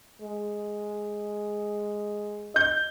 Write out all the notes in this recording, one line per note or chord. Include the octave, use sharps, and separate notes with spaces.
G#3
D#5 G6